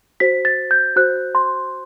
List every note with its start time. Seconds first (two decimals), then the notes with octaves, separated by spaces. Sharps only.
0.20 F#4 C5 B6
0.45 A6
0.71 G6
0.96 F#4 C5 F#6
1.35 C6